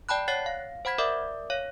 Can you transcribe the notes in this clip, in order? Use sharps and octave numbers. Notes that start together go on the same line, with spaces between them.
D5 G5 A5 B5 F#6
C#5 F#5 F#6 A6 C7
F5
C5 F#5 B5 G#6 B6
A#4 D5 E5 D6
C#5 F5